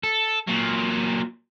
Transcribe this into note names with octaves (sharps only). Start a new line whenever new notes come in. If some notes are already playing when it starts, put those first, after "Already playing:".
A4
A#2 F#3